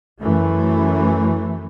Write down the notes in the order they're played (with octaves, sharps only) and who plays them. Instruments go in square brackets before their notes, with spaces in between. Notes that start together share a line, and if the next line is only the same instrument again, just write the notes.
[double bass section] F#2 E3 A3